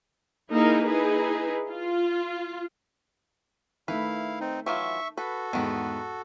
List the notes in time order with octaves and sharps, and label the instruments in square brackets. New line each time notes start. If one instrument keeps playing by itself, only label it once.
[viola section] A#3 D#4 E4 G#4 A#4
D#4 E4 G#4 B4
F4
[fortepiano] D#3 A3 [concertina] E4 F5 [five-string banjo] B4
[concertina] C4 D#4
[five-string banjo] E3 F#3 F4 [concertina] E5 C#6
[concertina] F#4 A4 [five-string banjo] B4
[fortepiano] E2 G#2 [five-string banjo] D#3 B3